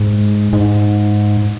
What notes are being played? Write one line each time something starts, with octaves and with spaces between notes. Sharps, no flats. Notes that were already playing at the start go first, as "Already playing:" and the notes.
Already playing: G#2
G#2